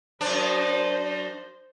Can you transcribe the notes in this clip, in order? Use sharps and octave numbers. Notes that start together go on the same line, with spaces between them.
F#2 D4 C5